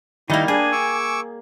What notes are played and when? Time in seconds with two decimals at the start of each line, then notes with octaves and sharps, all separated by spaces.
0.30 D#3 G3 A#3 D#4 E4
0.48 D4 G#4 G#5
0.72 C#6 D6 E6